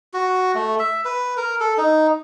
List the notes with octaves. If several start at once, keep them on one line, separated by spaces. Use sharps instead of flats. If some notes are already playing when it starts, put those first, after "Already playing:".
F#4
A3
E5
B4
A#4
A4
D#4